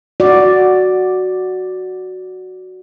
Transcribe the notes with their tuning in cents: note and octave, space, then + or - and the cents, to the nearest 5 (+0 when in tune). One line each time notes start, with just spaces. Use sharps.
F#4 +0 D5 +0